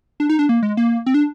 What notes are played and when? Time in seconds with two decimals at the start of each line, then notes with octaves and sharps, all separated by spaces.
0.20 D4
0.29 D#4
0.39 D4
0.49 A#3
0.63 G#3
0.77 A#3
1.06 C4
1.14 D4